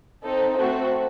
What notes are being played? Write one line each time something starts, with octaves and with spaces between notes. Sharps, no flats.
C4 D#4 A4
A3 C4 F#4 A4